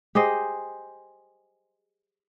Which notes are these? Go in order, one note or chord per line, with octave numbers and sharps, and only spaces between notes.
G4 G#4 C5 D#5